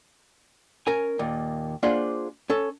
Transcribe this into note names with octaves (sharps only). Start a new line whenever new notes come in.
C#4 A#4 G#5
D#2 A#2
A#3 D4 F4 G#4 C5 F#5
C#4 A4